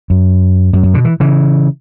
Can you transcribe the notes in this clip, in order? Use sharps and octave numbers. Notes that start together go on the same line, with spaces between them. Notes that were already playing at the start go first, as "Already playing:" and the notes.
F#2
F#2
F#2
B2 D3
E3
C#3 E3